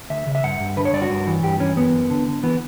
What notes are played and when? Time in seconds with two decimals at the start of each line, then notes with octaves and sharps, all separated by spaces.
0.10 D2 E5
0.27 C#3
0.35 E5
0.43 G2 F#5
0.60 G2
0.77 D3 B4
0.85 C#5
0.93 G2 D5
1.02 F#4
1.10 G2
1.27 E3
1.43 G2 G4
1.60 E3 C#4
1.77 F#2 B3
1.93 F#2
2.10 D3
2.27 D3
2.43 E3 B3